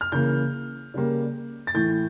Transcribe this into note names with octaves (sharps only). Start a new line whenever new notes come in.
F6
C#3 E3 A#3 G6
C#3 G3 A#3
A6
A2 E3 A3 G6